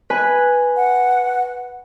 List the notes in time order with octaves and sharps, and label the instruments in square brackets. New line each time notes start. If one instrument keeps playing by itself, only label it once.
[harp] B4 G#5 F#6
[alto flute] F#5